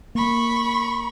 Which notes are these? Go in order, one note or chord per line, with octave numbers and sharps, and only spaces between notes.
A#3 B5 C#6